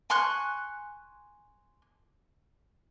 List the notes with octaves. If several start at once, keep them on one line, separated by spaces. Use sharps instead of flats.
G#5 C6 C#6 F#6